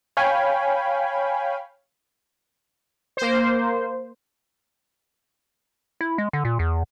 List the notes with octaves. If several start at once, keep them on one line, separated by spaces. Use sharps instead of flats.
C#5 F5 G5 G#5 B5
A#3 C5
E4
G#3
D3
A#2
E2